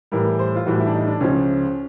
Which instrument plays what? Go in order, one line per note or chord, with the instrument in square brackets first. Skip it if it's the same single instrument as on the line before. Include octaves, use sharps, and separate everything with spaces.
[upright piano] A2 E3 G3 A#4
C5
F4
A2 E3 G3 F#4
E4
D4
D#4
D4
C#2 C#3 F3 C#4